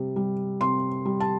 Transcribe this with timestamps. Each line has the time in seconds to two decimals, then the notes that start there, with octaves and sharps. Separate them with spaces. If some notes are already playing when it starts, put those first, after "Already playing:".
Already playing: C3 G3
0.16 G3
0.61 C3 C6
1.05 G3
1.20 A5